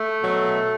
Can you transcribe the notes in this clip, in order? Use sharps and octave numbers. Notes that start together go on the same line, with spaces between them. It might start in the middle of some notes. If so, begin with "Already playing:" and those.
Already playing: A3
B2 F#3